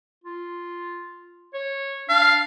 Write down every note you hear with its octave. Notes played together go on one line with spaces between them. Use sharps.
F4
C#5
D4 F5